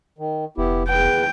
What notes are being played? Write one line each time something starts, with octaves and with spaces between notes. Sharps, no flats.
D#3
F1 B3 E4 G4
E2 B4 G5